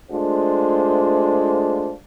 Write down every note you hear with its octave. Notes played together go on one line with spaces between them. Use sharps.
G#3 A3 D4 F4 C5